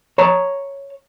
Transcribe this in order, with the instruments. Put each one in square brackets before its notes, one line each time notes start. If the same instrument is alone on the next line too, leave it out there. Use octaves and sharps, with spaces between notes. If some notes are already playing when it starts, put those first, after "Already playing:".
[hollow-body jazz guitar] C#5 A5 A#5